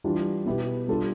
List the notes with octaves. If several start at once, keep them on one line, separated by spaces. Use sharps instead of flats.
E3 G3 D4 F4
B2 B3 E4 G4
G3 D4 F4 A4